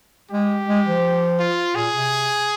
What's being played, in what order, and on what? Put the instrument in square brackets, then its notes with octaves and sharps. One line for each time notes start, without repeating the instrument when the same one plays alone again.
[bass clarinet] G#3 [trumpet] G4
[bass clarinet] G#3
F3
[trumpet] F4
[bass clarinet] A#2 [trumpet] G#4
[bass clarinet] C3